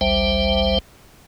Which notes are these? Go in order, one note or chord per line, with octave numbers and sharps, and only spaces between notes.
A1 D2 G3 C5 E5 G5